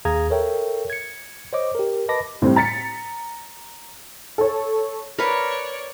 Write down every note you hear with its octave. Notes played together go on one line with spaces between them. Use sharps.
D#2 G#4 F5 A#5 D#6 G#6
A4 A#4 C#5 E5 G5
G#6 C#7
C5 C#5 D#5 D6
G4 A#4
B4 D#5 A5 B5 D6 A#6
A2 G3 C4
A#5 A6 B6 C#7
A4 C#5
A#4 B4 C#5 D5